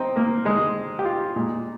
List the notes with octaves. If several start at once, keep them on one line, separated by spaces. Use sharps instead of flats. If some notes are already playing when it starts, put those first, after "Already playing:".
Already playing: C4 D#4 C5 D#5
A#3 A#4
G#3 G#4
G4
F4
A#2 G#3